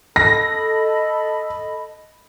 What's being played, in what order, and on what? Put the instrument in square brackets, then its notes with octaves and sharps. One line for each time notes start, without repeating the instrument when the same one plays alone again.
[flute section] A4 D#5 B5 [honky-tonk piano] A#6